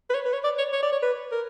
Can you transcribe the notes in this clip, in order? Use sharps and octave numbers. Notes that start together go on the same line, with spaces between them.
B4
C#5
B4
C#5
D5
C#5
C#5
D5
C#5
B4
A#4